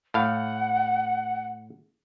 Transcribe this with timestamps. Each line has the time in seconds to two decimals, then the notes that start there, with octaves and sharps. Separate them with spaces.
0.14 A2 F5 F#5